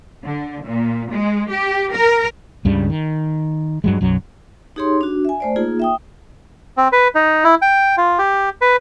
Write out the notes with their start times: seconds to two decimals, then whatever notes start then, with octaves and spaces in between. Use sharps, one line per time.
0.24 D3
0.65 A#2
1.11 G#3
1.50 G4
1.93 A#4
2.65 C#2 G2 C#3 G3
2.90 D#3
3.84 G2 F#3 G#3
4.01 B1 F#2 F#3
4.76 D#4 G4 G#4 C#5 C6
5.01 D4 F#4
5.25 E5 G#5
5.40 A3 C5 D5
5.56 A#3 D#4 F4 G#4
5.80 E5 G5 D#6
6.77 C4
6.92 B4
7.15 D#4
7.44 E4
7.62 G5
7.97 F4
8.18 G4
8.61 B4